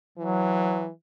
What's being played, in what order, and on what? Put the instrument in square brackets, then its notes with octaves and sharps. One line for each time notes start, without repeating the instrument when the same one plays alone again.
[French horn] E3 [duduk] F#3